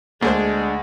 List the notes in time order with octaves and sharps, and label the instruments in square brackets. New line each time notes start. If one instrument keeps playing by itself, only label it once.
[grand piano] D2 [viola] G#3 [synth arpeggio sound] A#3 G#4 C5 [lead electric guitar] D4